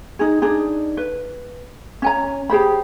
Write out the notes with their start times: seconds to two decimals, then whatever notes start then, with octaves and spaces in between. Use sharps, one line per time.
0.19 D#4 G#4
0.42 D4 D#4 G#4
0.97 B4
2.02 C#4 G#5 A#5
2.50 G4 G#4 C5 B5